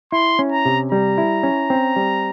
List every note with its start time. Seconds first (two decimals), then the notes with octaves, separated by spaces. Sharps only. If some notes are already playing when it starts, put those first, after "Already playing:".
0.12 E4 C6
0.39 C#4
0.52 A#5
0.65 C3
0.92 G3 A#5
1.18 E4
1.43 C#4
1.70 C4
1.96 G3